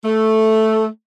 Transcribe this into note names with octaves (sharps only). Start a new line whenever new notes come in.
A3